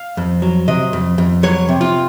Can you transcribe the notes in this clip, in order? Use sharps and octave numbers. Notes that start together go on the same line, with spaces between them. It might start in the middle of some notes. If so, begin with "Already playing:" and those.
Already playing: F5
F2
F#3
C3 D#5
F2
F2
F#3 C#5
C3
F4